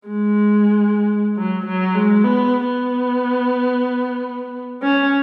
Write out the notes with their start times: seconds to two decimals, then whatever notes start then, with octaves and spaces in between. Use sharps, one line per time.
0.08 G#3
1.37 F#3
1.66 F#3
1.95 G#3
2.24 B3
2.67 B3
4.82 C#4